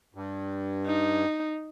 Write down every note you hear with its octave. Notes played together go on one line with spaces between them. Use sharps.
G2
D#4